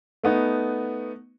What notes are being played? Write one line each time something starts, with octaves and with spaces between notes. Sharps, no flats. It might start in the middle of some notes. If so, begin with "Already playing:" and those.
A3 B3 D#4